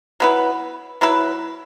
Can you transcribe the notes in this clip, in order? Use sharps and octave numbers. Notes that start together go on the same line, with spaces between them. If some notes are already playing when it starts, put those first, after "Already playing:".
F#3 B3 E4 B4
F#3 B3 E4 B4